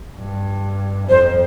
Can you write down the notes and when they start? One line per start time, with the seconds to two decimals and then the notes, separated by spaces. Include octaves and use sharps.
0.17 G2
1.09 F2 C5